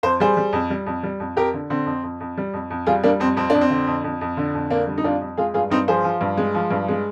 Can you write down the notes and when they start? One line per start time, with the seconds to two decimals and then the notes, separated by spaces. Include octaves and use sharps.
0.03 F2 C5
0.20 G3 G#4 C5
0.37 G3
0.53 F2
0.70 G3
0.86 F2
1.03 G3
1.20 F2
1.36 F2 G4 A#4
1.54 D3
1.70 D3 C4
1.86 F2
2.03 F2
2.20 F2
2.38 G3
2.53 F2
2.70 F2
2.87 G3 F4 G#4
3.04 G3 A#3 D4
3.20 F2 C4
3.37 F2 C4
3.50 F2 D4
3.61 C4
3.70 D3
3.87 F2
4.04 F2
4.21 F2
4.37 D3
4.55 F2
4.70 D3 A#3 D4
4.87 G3
4.98 D#4
5.04 F2 D4 F4
5.21 F2
5.37 G#3 F4 G#4
5.54 G2 F4 G#4
5.70 G2 C4 D#4
5.88 F3 G#4 C5
6.04 F3
6.21 G2
6.37 G#3
6.55 F3
6.71 G2
6.88 G#3